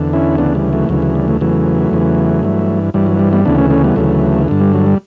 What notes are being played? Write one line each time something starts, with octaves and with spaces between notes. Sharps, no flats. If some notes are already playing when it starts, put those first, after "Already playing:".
Already playing: E2 D3
C#4 E4
D2 C#3 E3 B3 D4
G3
F#3 A3
D2 C#3 E3 F#3
F#3
G3
F#3 A3
E2 C#3 E3 F#3 A3
E2 C#3 E3
G2 E3
G2 E3 G3
F#3
G3
G3 B3
D2 C#3 E3 B3 D4
A3 C#4
A3 C#4
G3 B3
D2 C#3 E3 F#3 A3
G2 D3
G3
F#3
G3